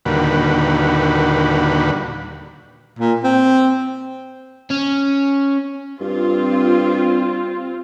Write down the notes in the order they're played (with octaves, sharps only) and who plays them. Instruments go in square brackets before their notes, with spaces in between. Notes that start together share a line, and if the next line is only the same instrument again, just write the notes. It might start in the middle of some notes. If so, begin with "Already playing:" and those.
[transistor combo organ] D#2 A#2 D3 G3 F#4 B4
[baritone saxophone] A#2
C4
[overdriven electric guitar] C#4
[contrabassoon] G2 [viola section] C4 F4